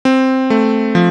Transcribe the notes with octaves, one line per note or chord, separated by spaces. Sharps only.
C4
A3
F3